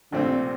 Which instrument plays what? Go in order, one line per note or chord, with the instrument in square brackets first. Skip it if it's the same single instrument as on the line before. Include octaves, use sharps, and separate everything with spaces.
[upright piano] A#1 A#2 A3 C4 [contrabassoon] D3
[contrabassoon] C3